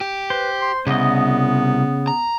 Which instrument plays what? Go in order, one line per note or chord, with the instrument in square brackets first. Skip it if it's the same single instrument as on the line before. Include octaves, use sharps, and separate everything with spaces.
[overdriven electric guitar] G4
[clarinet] B4 [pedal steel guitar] C5
[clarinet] C6
[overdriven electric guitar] C2 [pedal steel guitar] C#3 D#5 [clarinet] B3
[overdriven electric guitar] A#5